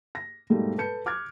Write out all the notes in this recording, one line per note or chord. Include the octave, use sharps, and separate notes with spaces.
A#6
G#2 B2 G3 A3 A#3
A4 B4 A5 G6 C#7
D6 F6 F#6 G#6